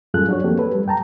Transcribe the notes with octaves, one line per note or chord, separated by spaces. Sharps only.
F#2 G3 F4 G#4 A4 F#6
D4 F#4 C#5
F3 A#3 C4 G4 A4
A4 B4
G3
F#2 G5 A5 A#5